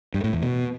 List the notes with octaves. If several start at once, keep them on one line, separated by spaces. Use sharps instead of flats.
G2
A2
E2
B2